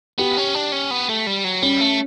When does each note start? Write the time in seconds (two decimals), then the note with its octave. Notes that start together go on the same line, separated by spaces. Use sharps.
0.18 B3 G4
0.37 C#4
0.55 D4
0.72 C#4
0.91 B3
1.09 A3
1.27 G3
1.44 F#3
1.62 G3 C#4
1.81 A3